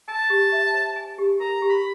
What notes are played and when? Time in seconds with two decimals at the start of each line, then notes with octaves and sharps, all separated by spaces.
0.08 G#5 A5
0.30 G4
0.52 E5
0.74 C5
0.96 G#5
1.18 G4
1.40 A#4 A#5
1.62 G4
1.69 B5